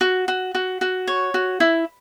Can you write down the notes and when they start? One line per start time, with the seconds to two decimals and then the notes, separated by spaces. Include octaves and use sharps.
0.01 F#4
0.28 F#4
0.55 F#4
0.81 F#4
1.08 C#5
1.34 F#4
1.60 E4